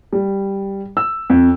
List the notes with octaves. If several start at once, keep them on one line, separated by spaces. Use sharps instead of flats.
G3
E6
F2